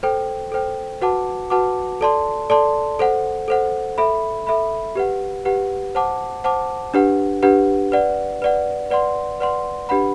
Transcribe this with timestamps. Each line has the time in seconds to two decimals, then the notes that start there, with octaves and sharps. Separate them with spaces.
0.03 A4 C5 G5
0.52 A4 C5 G5
1.01 F#4 B4 F#5 A5 D6
1.50 F#4 B4 F#5 A5 D6
2.01 A4 D5 A5 C6
2.50 A4 D5 A5 C6
2.99 A4 C5 F#5
3.48 A4 C5 F#5
3.98 A4 E5 B5
4.47 A4 E5 B5
4.95 G4 B4 F#5
5.45 G4 B4 F#5
5.95 C5 F#5 A5 D6
6.44 C5 F#5 A5 D6
6.94 D4 G4 B4 F#5
7.43 D4 G4 B4 F#5
7.92 B4 D5 F#5
8.42 B4 D5 F#5
8.90 B4 D5 F#5 C6
9.40 B4 D5 F#5 C6
9.89 D4 G4 B4 F#5 B5